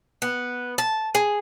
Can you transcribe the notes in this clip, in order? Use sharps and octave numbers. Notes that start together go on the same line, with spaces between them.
B3
A5
G#4